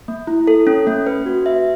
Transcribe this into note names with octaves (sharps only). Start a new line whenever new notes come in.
A#3
E4
A4
C#4
A#3
B4
F#4
E5